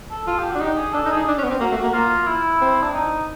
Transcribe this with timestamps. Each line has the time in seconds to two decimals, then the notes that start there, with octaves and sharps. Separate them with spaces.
0.10 A4
0.27 F4 A4
0.38 G4
0.50 D4 F#4
0.60 D#4 G4
0.77 G#4
0.93 D4 A4
1.05 D#4
1.11 G#4
1.17 D#4
1.28 D4
1.38 C#4
1.44 B3
1.50 C4
1.60 A#3 F#4
1.71 A3
1.77 F#4
1.83 A#3
1.94 A#3 F4
2.27 E4
2.61 C4
2.83 D4
2.93 D#4